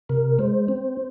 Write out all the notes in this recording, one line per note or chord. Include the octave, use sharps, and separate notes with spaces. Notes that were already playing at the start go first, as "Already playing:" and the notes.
C3 A#4
G#3 C5
C4